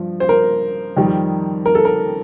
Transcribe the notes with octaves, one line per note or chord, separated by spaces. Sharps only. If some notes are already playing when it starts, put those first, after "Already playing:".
Already playing: G2 F3
C5
A#4
F2 D#3 G3
A#4
A4
A#4